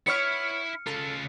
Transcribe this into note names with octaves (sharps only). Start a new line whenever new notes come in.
B3 E4 B4 C#5 E5 F6 C#7
C#3 F4 A4